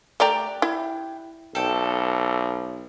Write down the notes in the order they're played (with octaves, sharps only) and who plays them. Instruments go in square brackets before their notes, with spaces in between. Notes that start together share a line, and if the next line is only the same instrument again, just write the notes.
[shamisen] A3 D5 A#5 [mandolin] D4 G4
[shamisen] E4
[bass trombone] B1 [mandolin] A4 G5